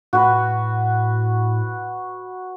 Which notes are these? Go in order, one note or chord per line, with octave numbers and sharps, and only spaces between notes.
A2 F#4 B4